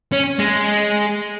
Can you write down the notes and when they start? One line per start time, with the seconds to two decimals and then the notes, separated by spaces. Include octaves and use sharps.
0.13 C#4
0.39 G#3